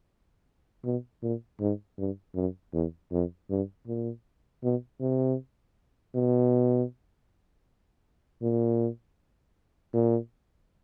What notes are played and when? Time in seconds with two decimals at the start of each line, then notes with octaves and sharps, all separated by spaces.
0.85 B2
1.22 A#2
1.60 G#2
1.98 G2
2.35 F#2
2.73 E2
3.12 F2
3.50 G2
3.87 A#2
4.63 B2
5.00 C3
6.15 B2
8.42 A#2
9.94 A#2